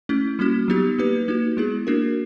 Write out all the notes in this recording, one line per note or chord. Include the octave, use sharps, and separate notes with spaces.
A3 C#4 E4
G3 A#3 C#4 F#4
F#3 B3 D#4 G4
A#3 D#4 G4 B4
A#3 D#4 F#4
G#3 B3 E4 G#4
A#3 D4 F#4 A#4